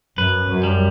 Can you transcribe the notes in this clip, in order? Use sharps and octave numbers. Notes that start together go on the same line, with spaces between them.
F#2 B4
F#2
G3